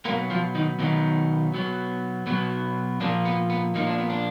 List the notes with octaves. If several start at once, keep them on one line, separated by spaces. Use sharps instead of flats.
B2 F#3 A#3 B3 A#4
F3 F4
D#3 D#4
B2 D#3 F#3 B3 D#4
B2 F#3 B3
B2 F#3 B3
A#2 F3 A#3 D4
B3
B3
A#2 F3 A#3 D#4
D4
B3
D4